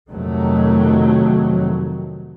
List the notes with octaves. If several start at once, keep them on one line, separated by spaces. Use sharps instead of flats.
F2 C3 D#3 F#3 A3